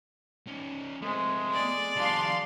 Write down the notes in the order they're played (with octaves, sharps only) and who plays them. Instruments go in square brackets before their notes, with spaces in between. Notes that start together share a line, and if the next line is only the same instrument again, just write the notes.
[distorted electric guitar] C#4 D#4
[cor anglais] G#3 [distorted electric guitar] A3 C4
[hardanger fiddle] G#4 D5
[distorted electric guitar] F3 G3 [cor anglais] D4 [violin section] F5 C6